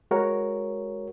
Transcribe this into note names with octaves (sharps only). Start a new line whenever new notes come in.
G#3 F#4 A#4 C#5